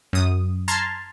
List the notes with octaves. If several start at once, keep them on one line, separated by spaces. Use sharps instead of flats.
F#2 D#6
A5 A#5 C6 F6 G#6